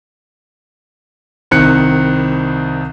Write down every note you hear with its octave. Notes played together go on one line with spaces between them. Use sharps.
C2 D#3 C4 F#6 C#7